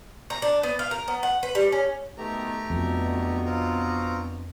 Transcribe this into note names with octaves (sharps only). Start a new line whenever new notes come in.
A#5
D4
B3
F5
A#4
B3
F#5
B4
G3
C#4
B2 D#3 A3 B3 G4 A#5
F2 B2 D4
C4 F4 A#5